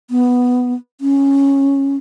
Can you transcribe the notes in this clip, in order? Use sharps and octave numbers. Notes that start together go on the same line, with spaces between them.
B3
C#4